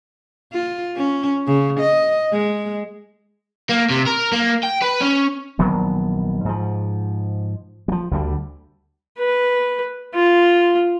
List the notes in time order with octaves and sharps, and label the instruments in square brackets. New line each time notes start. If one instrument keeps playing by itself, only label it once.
[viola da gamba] F4
C#4
C#3
D#5
G#3
[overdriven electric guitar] A#3
C3
A#4
A#3
G5
B4
C#4
[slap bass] A#1 D#3 F#3 B3
G#2 F3
F3 G3
D2 D3 G3
[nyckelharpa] B4
F4